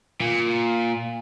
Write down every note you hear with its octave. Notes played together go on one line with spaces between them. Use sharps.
A#2